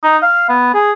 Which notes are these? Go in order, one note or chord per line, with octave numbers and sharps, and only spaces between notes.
D#4
F5
B3
G#4